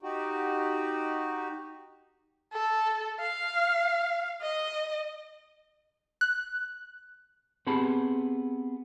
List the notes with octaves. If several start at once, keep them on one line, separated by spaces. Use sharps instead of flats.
D#4 F#4 G4
A4
F5
D#5
F#6
B3 C4 G4 G#4 A5 B5